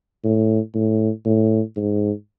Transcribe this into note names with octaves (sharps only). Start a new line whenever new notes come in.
A2
A2
A2
G#2